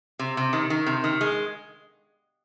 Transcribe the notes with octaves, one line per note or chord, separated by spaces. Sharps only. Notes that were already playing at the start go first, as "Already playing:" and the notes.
C3
C3
D#3
D#3
C3
D#3
G#3